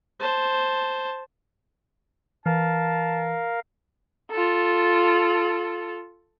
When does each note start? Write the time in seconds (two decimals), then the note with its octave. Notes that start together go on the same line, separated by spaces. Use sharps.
0.19 C5 A5
2.46 E3 A#4 F5 A5
4.31 F4 A4